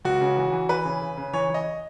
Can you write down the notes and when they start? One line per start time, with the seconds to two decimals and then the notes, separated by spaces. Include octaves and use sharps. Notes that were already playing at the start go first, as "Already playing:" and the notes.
0.05 C#2 F#4
0.21 C#3
0.37 E3
0.53 E3
0.69 E3 B4
0.85 C#3
1.01 C#3
1.17 C#3
1.33 E3 C#5
1.49 E3
1.54 D#5